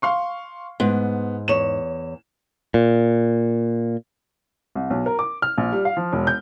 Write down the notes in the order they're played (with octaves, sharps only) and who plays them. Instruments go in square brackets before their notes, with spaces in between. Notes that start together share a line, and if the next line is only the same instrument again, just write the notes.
[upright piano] F5 C6 C#6
[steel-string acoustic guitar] G#2 [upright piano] B3
[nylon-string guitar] E2 C#5 [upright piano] E7
[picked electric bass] A#2
[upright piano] C2
B1
A#4
D6
F6
A#1
G3
F5
F3
E1
G6